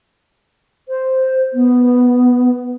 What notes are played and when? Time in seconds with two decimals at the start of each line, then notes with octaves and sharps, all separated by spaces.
0.89 C5
1.53 B3